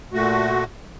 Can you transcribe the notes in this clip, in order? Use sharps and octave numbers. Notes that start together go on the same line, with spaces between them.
A#2 A3 F#4